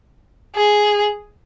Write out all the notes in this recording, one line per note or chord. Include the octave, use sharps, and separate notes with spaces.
G#4